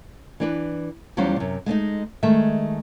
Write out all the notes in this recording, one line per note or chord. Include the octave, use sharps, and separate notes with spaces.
E3 D4 B4
E2 F#3 G3 C#4 F4 C5
F#2 C3
G#3 A3 C#4 D#4
D#3 G#3 A3 G#4 E5